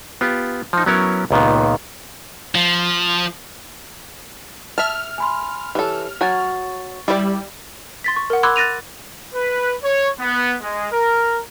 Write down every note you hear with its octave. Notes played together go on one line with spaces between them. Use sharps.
B3 F4 G4
F3 D#4
F#3 B3 C#4 E4 A#4 C#5
C#2 A#2 D#3 B3
F3
E5 A5 F6
G#5 B5 C6
E3 G4 A4 C#5
F#3 F#4 G#5 C#6 A6
G3 E4 D5
C6 A6 B6
C#6
A#4 F#5
B5 C6 D6 E6 F#6 G#6
F#6 A6 A#6 D#7 F7
B4
C#5
B3
G#3
A#4